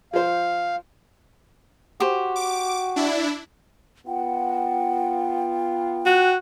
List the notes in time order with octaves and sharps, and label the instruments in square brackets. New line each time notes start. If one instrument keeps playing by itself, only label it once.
[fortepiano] F3 C5 [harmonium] F5
[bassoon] F#4 [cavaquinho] G4 C5
[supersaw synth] D6
D4 E4
[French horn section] B3 F4 [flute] F#5 [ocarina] G5
[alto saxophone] F#4 [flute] F#6